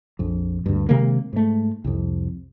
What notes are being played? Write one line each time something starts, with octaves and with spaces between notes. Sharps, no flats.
A#1 F2
D2 G2
C3 D#3 G#3 A#3
G#2 A3
C2 F2